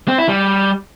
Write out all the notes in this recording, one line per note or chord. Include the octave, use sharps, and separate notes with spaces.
C4
E4
G3